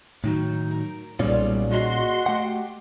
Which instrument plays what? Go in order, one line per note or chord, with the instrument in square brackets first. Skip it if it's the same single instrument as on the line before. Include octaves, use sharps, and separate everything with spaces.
[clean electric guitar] A2 D#3 F#3 [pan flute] D#4
[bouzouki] A#4
[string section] B1 [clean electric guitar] A#2 C#4 F4 [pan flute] G3 [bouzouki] G#4 D5 F5
[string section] F#4 C6 [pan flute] D#5
[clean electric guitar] A3 F#5 [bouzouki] G4